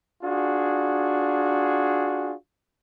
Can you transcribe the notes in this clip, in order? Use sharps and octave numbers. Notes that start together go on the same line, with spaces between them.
D4 F4 F#4 G#4